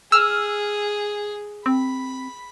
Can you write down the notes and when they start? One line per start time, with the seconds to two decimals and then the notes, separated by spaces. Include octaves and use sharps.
0.12 G#4 E6 F6
1.66 C4 B5